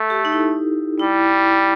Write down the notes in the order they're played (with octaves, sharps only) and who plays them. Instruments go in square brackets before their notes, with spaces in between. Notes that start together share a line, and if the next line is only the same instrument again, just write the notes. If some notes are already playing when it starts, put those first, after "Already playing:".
Already playing: [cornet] A3 [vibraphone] A4
[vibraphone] G4
D#4
E4
[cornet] G3 [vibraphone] E4